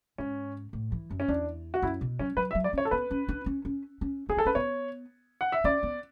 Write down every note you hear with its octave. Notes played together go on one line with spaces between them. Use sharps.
G#2 C#4
A2
E3
F#2
C#4
E2 D4
F#4
F#2 E4
B2
F#3 C#4
F#3 B4
E5
F#3
D5
C#4 C#5
A4
B3 B4
C#4
D4
C#4
C#4
C#4
C#4 G#4
D4 A4
C#4 B4
B3 C#5
F#5
E5
C#4 D5
B3